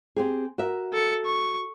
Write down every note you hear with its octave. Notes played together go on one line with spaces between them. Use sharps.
C4 G4 G#4
F#4 A#4 E5
A4 C#7
C#6